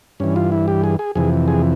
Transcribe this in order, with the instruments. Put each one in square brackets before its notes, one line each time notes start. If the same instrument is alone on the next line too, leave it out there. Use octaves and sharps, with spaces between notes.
[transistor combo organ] G2 E3 C#4
F4
E4
G4
G#4
G#4
F2 C3 E3 G#4
G#4